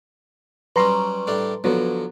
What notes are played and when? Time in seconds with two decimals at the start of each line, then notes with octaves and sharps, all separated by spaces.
0.76 F#3 G3 C#4 B4 A#5 C6
1.27 A2 G3 D4
1.64 D3 F3 F#3 B3